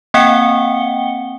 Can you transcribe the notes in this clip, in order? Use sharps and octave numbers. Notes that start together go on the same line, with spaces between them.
A#3 C4 F#5 G5 C#7 G7